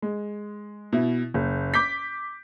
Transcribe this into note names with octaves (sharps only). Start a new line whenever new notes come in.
G#3
B2 E4
F#1
D6 G6 B6